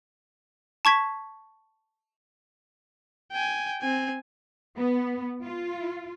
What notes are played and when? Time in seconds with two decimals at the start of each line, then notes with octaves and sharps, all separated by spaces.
0.85 A5 C#6 G#6 B6
3.32 G5 G#5
3.82 C4 G#5
4.77 B3
5.43 F4